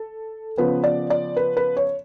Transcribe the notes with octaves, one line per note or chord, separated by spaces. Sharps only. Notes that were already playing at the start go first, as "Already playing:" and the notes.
Already playing: A4
C#3 F3 B3 B4
D5
D5
B4
B4
C#5